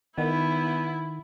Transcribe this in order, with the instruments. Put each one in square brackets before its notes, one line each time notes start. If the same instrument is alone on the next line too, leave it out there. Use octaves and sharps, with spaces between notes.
[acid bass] D#3 [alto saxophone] B3 [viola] E4